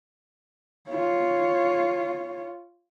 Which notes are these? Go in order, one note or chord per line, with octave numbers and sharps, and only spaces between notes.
F4 C#5